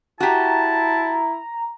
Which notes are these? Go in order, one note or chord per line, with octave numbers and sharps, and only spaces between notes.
E4 F#4 G4 A5 A#5